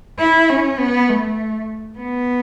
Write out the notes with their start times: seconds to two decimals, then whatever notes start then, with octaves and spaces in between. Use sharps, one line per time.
0.19 E4
0.49 C#4
0.79 B3
1.09 A3
1.99 B3